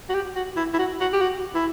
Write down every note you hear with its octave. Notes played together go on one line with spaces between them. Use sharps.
F#4
G4
F#4
E4
E4
F#4
F#4
G4
F#4
E4